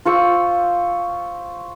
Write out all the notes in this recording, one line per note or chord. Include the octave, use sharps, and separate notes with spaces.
F4 C5 C#6 E6